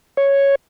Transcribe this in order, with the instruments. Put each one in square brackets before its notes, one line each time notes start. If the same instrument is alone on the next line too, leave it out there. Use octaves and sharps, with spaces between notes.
[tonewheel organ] C#5